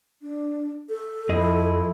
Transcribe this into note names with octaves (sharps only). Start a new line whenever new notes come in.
D4
A4
F2 F3 E4 G#4 D#5